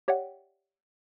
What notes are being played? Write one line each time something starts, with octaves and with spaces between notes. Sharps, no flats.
G4 C#5 D5 E5 F#5 G5